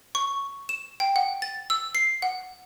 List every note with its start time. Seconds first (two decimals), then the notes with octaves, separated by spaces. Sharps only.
0.15 C#6
0.69 E7
1.00 G5
1.16 F#5
1.42 A6
1.70 E6
1.95 C7
2.22 F#5